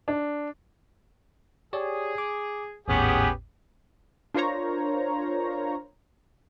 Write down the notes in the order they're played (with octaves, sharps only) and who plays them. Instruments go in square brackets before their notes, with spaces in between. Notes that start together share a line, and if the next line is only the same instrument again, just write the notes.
[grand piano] D4
[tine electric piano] G4 C#5 D5 [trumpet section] G#4
[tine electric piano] D6
[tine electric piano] G#1 D#2 A2 [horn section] B3 C#4 G#4 [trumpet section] G4
[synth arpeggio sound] D4 F4 A#4 C5 C#5 A#5